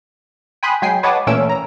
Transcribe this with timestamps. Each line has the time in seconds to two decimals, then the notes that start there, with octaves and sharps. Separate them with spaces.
0.63 G5 G#5 B5 C6 D#6 F#6
0.82 F#3 G#3 G5 G#5 C7
1.03 B4 C#5 D#5 F#5 A5 D6
1.27 A#2 E3 A3 C#4 E6 D7
1.49 A#5